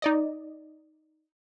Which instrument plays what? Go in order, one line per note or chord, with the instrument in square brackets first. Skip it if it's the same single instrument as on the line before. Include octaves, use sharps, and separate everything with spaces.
[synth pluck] D#4 D5 D#5